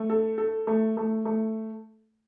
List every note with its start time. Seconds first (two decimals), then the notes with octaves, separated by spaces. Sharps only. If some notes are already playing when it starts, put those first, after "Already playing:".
Already playing: A3
0.10 A4
0.38 A4
0.67 A3
0.97 A3
1.25 A3